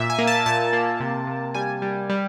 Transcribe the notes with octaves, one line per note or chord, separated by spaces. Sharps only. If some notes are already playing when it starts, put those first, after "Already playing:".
Already playing: A#2 E5
G#5
A#3
A5
A#2 A5
A#3
C3
C3
G3 G#5
G3
G3